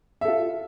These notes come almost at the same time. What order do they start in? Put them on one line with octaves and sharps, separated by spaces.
E5 A4 F4